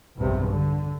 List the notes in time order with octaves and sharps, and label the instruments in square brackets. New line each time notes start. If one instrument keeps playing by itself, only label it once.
[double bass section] B1 E2 G2 C3
D3